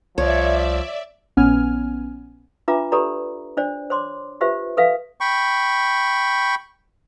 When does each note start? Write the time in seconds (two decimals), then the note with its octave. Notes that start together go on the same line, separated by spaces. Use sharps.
0.18 C2 F3 C#5 D5 E5
1.37 A#1 B3 C#4 G#5 F6
2.68 D4 F4 B4 E5 A#5 D6
2.92 G4 A4 B4 D5 A#5 B5
3.57 D4 C5 D5
3.90 C5 C#5 C6 D6
4.41 F4 G4 B4 C5 E5
4.77 A4 B4 E5 F5
5.21 G5 B5 C#6